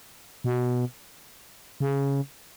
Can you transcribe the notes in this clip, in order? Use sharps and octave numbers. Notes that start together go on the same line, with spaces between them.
B2
C#3